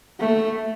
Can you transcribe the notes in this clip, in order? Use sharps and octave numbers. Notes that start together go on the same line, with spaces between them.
A3